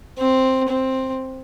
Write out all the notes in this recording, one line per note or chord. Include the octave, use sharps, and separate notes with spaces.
C4
C4